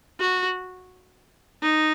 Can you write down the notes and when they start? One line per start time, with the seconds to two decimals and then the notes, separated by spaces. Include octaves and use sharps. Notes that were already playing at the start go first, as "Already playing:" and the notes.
0.20 F#4
1.62 D#4